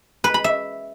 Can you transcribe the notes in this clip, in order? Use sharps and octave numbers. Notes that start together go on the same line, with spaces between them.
B4
B5
E5